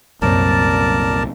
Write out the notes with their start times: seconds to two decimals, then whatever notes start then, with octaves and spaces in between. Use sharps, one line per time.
0.22 C2 F#2 A#2 C4 A#4 D5 A5